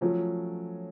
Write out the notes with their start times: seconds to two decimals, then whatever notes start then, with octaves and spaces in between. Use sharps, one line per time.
0.01 F3 F#3 A3 C#4